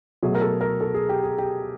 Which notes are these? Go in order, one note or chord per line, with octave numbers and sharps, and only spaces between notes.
B2 F#3 A3 G#4
A#4
A4
A#4
A4
G#4
G4
G#4
G4